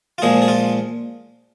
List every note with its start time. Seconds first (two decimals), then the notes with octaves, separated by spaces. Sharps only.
0.18 F4
0.22 A#2 F3 G#3 G#4
0.42 G#4
0.48 F4